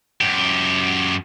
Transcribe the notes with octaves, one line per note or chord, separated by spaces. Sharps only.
F#2 G4